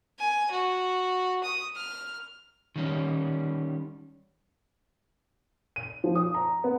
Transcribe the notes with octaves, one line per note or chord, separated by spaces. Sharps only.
G#5
F#4
D#6
F6
D#3 G3 C#4
D#7
F3
D#6
A#5
B3